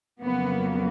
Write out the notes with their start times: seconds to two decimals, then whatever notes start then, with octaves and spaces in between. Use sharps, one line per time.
0.21 F2 C#3 F#3 A#3 B3